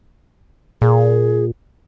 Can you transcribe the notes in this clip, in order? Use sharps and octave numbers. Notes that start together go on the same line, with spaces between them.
A#2 G#4